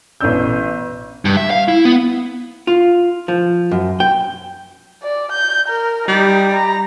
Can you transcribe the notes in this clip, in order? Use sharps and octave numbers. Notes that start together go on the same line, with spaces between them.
A1 B2 C#4 D4 E6 G6
G2
E5
F5
E4
B3
F4
F3
F#2
G5
D5
G6
A#4
G3 D#4
A#5